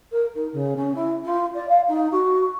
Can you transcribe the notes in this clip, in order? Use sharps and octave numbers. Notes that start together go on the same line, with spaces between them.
A#4
D#4
C#3
C#4
E4
F4
D5
F5
D#4
F#4